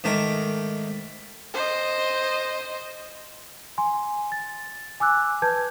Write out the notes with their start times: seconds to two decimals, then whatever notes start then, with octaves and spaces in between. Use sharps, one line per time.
0.04 G#2 D#3 A3 A#4 D6
1.54 C5 D#5
3.78 G#5 C6
4.32 A6
5.00 G#5 D6 E6 F#6
5.42 B4 A5 G6 G#6